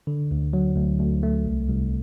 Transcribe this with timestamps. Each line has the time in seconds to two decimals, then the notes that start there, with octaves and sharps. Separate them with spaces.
0.07 D3
0.31 D2
0.53 F#3
0.76 D2
1.00 D2
1.23 A3
1.46 C2
1.68 C2